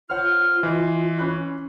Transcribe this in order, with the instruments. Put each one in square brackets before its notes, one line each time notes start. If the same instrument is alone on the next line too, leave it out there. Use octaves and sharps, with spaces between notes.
[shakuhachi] F4 [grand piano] C5 C#5 F#5 [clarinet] F6
[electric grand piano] E3 [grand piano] D#5 [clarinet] C6
[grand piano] C#4 B5 F#6